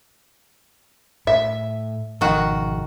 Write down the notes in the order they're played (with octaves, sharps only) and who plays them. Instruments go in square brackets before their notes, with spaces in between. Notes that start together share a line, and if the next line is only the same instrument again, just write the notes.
[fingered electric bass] A2 [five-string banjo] E5
[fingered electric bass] G#1 B2 F3 [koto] D#3 F#4